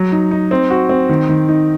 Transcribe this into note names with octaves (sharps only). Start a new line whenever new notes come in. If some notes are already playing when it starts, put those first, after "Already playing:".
Already playing: F#3
D#4
D#4
C4
F#4
C4
D#3
D#3
D#4